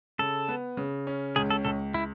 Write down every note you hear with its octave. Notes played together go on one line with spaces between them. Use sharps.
C#3 A4
B3
C#3
C#4
C#2 G#4
A4
C#2 A4
E4